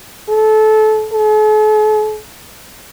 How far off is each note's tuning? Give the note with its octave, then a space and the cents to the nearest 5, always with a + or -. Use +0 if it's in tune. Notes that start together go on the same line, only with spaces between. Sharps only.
A4 -25
A4 -45